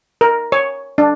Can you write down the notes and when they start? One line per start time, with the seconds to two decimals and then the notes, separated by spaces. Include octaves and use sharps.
0.21 A#4
0.52 C#5
0.98 D4